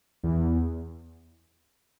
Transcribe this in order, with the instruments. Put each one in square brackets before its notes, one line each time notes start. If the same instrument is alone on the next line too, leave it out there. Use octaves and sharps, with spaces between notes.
[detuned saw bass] E2